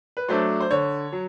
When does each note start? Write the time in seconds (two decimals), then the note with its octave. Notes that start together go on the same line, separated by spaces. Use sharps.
0.17 B4
0.29 F#3 A3 D4 C5
0.61 C5
0.71 D3 C#5
1.12 F#3